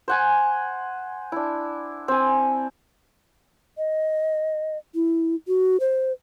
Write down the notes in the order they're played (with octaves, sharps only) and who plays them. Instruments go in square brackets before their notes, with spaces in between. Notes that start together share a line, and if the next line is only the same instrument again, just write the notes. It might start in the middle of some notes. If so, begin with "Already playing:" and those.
[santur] C5 F#5 G#5
D4 E4
C4 G#5
[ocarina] D#5
E4
F#4
C5